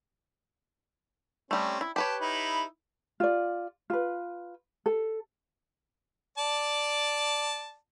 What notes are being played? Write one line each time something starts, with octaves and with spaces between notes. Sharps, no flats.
G3 A3 C4 C#4
E4
G4 B4 C#5 G5 A5
D#4 E4 B5
F4 D5
F4 B4
A4
D5 A5